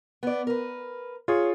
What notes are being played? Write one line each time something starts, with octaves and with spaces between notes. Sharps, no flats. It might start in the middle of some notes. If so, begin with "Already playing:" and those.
B3 D5
A#4 B4
F4 G#4 C#5